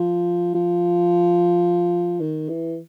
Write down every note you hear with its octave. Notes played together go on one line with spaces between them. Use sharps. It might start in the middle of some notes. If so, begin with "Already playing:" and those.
Already playing: F3
F3
D#3
E3